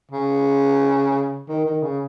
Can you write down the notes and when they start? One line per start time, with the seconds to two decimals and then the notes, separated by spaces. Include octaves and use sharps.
0.11 C#3
1.49 D#3
1.66 D#3
1.83 C#3